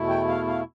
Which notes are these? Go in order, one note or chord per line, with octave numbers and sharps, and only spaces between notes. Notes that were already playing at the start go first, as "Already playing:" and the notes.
Already playing: E2 B2 A3 E4
G5
F5
F5